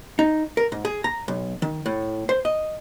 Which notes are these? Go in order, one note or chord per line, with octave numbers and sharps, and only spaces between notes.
D#4
A#4
G#2
G#4
A#5
B1
D#3
A2
C5
D#5